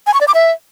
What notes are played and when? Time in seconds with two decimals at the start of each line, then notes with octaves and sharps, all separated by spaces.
0.07 G#5
0.14 C#6
0.21 D5
0.28 D6
0.35 E5